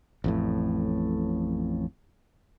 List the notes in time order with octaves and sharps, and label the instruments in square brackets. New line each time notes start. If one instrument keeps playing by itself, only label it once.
[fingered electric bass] A1 F2 A2